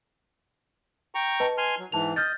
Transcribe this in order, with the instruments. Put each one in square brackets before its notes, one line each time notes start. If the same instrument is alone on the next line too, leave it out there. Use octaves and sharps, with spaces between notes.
[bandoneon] G5 A#5 C#6
[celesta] B4 D#5 A5
[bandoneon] G#5 C6 F6
F#3
[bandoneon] G#2 E3 [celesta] A5 F7
[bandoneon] D#5 [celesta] F6 G6 A6